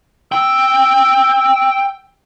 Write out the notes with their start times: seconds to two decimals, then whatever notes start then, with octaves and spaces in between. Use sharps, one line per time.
0.32 G5 E6